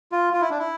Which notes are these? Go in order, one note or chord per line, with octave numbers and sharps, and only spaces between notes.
F4
F4
E4
D4
E4